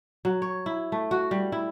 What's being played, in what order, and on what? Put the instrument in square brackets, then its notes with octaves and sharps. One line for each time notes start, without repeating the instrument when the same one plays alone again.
[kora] F#3
C#5
E4
A3
F#4
G3
E4